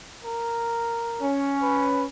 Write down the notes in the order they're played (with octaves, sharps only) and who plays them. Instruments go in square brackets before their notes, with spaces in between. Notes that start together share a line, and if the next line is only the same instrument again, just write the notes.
[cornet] A#4
[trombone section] C#4
[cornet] B4